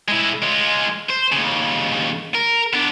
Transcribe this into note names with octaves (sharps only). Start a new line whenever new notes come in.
G#3 E4
G#3 F4
C5
D#2 C#3
A#4
B3 D4